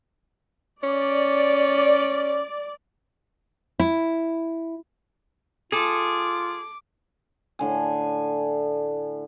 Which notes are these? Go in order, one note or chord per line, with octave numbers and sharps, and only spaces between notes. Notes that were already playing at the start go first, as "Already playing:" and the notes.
C#4 D5
E4
F4 G#4 A4 D6
A2 D3 G#5